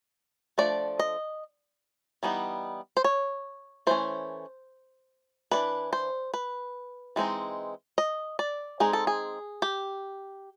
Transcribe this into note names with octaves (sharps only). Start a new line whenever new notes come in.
F3 A3 D4 D5
D#5
E3 G3 B3 D#4
C5
C#5
E3 A3 C#4 C5
E3 A3 D4 B4
C5
B4
E3 G#3 C4 D#4
D#5
D5
G#3 C4 D#4 G#4
A4
G#4
G4